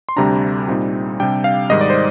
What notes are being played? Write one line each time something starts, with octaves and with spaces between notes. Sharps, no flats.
C6
D2 C3 G3 D4 A#5
A#2 G3 C4 D#4
C3 G3 D4 G5
F5
G#2 D#3 G3 D#5
D5
C5